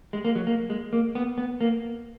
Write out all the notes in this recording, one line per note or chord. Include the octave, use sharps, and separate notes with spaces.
G#3
A#3
F#3
A#3
G#3
A#3
B3
B3
A#3